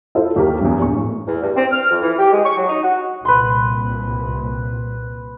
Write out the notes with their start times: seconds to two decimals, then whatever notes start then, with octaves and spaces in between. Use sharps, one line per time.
0.15 E4 F4 A4 C5
0.36 D#2 G4 A#4
0.61 E2 G2
0.81 A#1 C#6
0.96 A2
1.27 E2
1.42 G2
1.57 C4
1.71 F6
1.91 F2
2.02 E3
2.19 G4
2.33 G#3
2.45 C#6
2.57 F#3
2.69 D#4
2.83 F#4
3.25 C2 A#2 B4 B5 C6